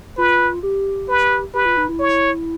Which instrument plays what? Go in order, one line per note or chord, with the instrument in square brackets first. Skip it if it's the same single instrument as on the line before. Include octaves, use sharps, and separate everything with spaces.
[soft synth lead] F4 [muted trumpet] B4
[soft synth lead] G4
[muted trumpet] B4
[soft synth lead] G4 [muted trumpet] B4
[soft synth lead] F4
D#4
E4
[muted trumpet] C#5